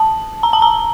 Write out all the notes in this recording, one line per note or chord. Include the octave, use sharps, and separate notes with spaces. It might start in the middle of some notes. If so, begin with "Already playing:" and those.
Already playing: A5
A#5
A5
A#5